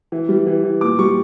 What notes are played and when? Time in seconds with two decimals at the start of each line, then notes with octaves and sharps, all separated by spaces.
0.12 E3
0.29 G3
0.47 E3
0.64 E3
0.81 A#2 D6
0.99 G3 C#6